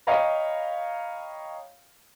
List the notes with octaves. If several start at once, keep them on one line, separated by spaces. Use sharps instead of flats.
C#5 D#5 F5 G5 A#5 B5